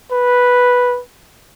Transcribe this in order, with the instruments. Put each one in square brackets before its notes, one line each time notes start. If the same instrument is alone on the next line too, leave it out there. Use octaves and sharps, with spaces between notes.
[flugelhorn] B4